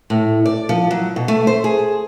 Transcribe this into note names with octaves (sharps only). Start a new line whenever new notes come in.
A2
D5
F3
F#3
B2
A3
C5
G#4